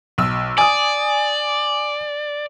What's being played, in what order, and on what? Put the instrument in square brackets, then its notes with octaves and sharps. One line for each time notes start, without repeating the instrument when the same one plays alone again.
[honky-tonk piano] B1 E6
[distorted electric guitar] D5 [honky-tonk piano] G#5 D#6